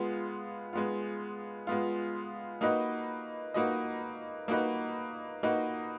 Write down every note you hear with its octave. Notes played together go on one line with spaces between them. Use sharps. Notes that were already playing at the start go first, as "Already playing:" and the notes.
Already playing: G#3 B3 F4
G#3 B3 F4
G#3 B3 F4
A#3 D#4 F#4 B4 D#5
A#3 D#4 F#4 B4 D#5
A#3 D#4 F#4 B4 D#5
A#3 D#4 F#4 B4 D#5